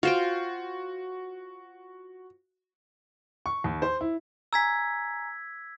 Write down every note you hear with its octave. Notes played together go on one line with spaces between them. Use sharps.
F4 F#4 C5 G5
C#6
D#2
C5
E4
G#5 A#5 E6 G#6 B6